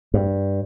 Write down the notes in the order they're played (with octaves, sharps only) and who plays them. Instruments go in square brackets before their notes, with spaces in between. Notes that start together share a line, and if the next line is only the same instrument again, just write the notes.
[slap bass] G2